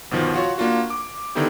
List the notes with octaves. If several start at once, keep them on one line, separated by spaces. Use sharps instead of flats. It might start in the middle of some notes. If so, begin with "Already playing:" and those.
G1 B2 D#3 F3
F4 F#4 C#5
A#3 D4 F4 F#4
D6
D3 D#3 B3 D#4 E4 G4